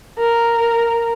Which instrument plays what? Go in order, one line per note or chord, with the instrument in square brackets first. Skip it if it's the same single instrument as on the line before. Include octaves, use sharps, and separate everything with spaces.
[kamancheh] A#4